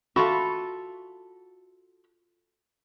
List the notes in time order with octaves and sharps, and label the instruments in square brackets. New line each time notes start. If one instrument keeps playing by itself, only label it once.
[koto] F4 A4 E5 [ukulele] F#4 B5